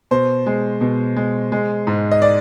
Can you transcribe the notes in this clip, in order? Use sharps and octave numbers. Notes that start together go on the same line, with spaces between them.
B2 C5
G#3
B2
G#3
G#3
G#2
D#5
D5